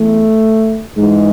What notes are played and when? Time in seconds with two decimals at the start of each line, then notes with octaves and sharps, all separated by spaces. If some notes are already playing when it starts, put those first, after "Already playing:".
Already playing: E2 A3
0.95 G#2 E3 G#3